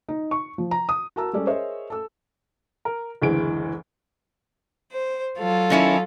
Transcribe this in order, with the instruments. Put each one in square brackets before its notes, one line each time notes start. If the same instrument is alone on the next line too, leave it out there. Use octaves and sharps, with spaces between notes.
[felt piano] D#4
C#6
F3
A#5
D#6
F#4 A#4 A5 A#5 E6
G3 G#3 C#4 A4 D5
G#4 A#4 C5 C#5 D#5 E5
A4 E6
[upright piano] A#4
F#1 D2 E3 G#3 D7
[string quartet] C5
F#3 F4 A4
[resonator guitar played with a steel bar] D#3 C#4 E4